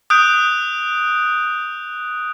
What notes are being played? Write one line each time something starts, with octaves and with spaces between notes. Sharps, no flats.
D#6 F#6 G6 D7